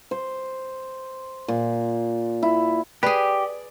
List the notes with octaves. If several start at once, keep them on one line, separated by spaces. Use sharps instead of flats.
C5
A#2
E4
G4 G#4 B4 D5